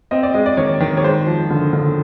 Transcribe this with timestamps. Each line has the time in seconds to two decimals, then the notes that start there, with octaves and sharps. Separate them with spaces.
0.11 C4 D#5
0.23 D5
0.34 G#3 D#5
0.46 D5
0.57 D#3 C#5
0.80 D#3
0.97 C#5
1.04 G#3 C5
1.27 F3
1.50 D3
1.73 D3